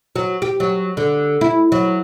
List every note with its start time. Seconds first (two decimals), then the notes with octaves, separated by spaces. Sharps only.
0.16 F#3
0.42 G4
0.60 F#3
0.97 D3
1.41 E4
1.72 F#3